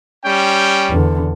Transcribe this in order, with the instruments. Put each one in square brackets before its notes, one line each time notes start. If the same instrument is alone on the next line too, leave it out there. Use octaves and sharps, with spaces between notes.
[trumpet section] G3 C#4 G5
[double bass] E2 D3